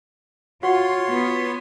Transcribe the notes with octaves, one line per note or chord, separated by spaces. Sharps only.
F4 F#4 C#5 F#5 C6
B3